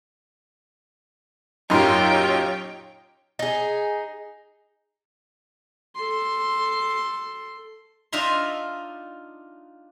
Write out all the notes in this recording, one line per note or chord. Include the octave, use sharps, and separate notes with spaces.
F#2 A#2 D#4 F4 G4 C#5 G5 C6
D#4 G#4
A4 C6
D4 D#4 F4 E5 A#5 C6